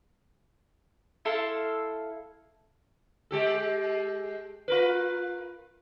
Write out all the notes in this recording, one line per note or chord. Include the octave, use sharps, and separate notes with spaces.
E4 A4 F5 C6
G#3 G4 A4
F4 A#4 B4